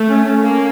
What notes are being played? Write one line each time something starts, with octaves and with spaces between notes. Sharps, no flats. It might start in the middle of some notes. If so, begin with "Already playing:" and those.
Already playing: A3
C#4
C#4
A#3